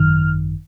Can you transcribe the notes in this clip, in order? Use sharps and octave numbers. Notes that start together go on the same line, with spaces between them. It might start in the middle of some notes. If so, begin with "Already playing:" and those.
Already playing: G#1 F#2 D#3 F6